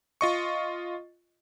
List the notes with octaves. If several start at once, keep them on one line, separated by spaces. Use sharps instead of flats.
F4 D#5 C#6